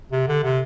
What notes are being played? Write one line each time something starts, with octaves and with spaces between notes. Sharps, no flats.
C3
D3
C3